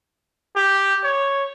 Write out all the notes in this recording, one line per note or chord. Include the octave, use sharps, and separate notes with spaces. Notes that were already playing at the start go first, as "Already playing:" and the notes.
G4
C#5